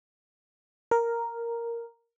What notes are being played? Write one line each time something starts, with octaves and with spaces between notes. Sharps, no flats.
A#4